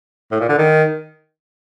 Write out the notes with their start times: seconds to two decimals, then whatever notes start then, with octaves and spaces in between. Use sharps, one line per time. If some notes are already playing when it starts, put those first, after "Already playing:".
0.32 A2
0.40 A#2
0.49 D3
0.58 D#3